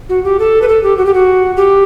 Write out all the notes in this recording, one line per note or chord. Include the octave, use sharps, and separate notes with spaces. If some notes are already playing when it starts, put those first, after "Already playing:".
F#4
G4
A4
B4
A4
G4
F#4
G4
F#4
G4